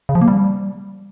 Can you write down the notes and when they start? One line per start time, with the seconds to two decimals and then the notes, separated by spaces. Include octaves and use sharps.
0.09 C#3
0.15 F3
0.22 A#3
0.28 G3